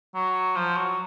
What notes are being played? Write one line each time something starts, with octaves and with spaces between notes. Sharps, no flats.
F#3
F3
F#3